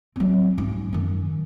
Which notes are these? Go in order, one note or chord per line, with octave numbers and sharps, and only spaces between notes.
F#3 C4
G#2 C#4
F#2 D#3